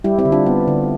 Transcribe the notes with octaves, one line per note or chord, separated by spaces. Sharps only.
G3 E4 G4
C4 E4
D3
D4 F4
B3
D3